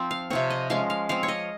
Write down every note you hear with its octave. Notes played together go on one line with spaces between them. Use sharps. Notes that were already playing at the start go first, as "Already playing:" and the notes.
Already playing: F3 C4
F5
C3 F3 C4 C#5
D#5
F3 G#3 C#4 F5
F5
F3 C4 F5
C#5
D#5